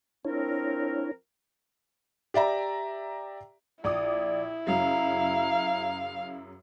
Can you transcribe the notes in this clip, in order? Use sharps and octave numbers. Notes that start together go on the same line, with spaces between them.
F3 C4 D4 E4 A#4 C#5
G4 D5 E5 A#5
A#1 E4 D5 D6 D#6
F#2 C#3 F#3 F5 A#5